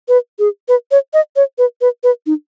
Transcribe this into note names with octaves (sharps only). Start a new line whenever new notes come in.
B4
G#4
B4
C#5
D#5
C#5
B4
B4
B4
D#4